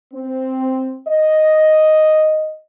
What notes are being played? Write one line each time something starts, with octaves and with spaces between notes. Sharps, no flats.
C4
D#5